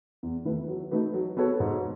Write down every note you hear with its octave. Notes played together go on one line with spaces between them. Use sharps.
E2
D#3 A3 E4 B4
F#3
A3 D#4 F#4 B4
F#3
B3 F#4 A4 C#5
G#2